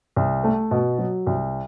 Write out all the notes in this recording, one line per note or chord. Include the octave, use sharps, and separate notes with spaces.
C2
A3
B2
F#3
C2